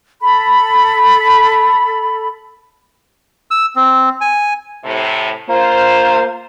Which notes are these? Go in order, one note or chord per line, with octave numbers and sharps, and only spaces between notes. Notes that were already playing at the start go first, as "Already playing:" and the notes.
A4 B5
E6
C4
G#5
A2 C3
A#3 F4 C5